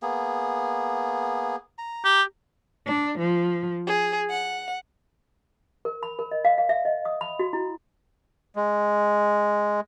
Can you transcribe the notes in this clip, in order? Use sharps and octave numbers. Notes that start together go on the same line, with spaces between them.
A#3 B3 G#4
A#5
G4
D4
F3
G#4
F#5
A#4
B5
A#4
D#5
F5
F5
E5
D#5
D#6
B5
F#4
E4
G#3